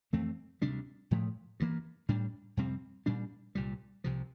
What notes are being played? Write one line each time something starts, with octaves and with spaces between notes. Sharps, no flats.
F2 E3 A3 C4
D2 C3 G3 D4
A2 F3 A3
G2 E3 A#3
A2 G3 D4
F2 C3 G3 C4
A#2 G3 D4
C2 A#2 G3
C2 C3 F3